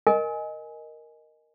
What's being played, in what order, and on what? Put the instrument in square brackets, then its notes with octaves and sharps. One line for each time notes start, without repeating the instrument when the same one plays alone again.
[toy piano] A#4 D#5 G#5